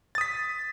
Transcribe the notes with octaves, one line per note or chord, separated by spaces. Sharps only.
D#6 A6 B6